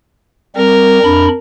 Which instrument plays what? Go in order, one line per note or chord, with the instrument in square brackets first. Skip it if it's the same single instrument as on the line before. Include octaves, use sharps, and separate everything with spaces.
[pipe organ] G3 C4 [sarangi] A#4
[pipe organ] F2 D4 B5